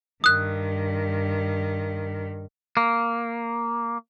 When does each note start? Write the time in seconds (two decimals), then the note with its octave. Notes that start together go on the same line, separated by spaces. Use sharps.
0.24 G2 D#3 D#6 F#6
2.77 A#3